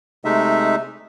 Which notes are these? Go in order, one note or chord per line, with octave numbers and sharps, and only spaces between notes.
C3 G#3 A3 D#4 E5